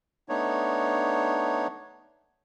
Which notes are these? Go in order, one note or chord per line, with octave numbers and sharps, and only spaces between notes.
A3 B3 D4 D#4 C#5